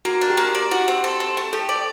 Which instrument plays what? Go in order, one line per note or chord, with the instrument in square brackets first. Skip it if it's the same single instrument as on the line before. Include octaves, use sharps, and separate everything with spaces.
[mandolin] A#3 [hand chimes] F#4
[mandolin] D4
[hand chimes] G4
[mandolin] A#3
D5
F#4
C4
A4
C4
A3
[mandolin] G4 [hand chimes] A4
[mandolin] D5